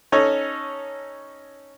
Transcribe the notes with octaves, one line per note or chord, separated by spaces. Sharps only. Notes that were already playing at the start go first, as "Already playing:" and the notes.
C#4 D#4 A4 C#5